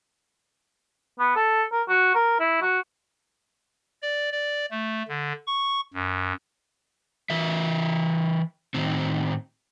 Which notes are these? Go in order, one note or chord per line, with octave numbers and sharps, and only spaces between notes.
B3
A4
A#4
F#4
A#4
E4
F#4
D5
D5
A3
D3
C#6
F#2
E3 A#4 E5
A2 D#3 C4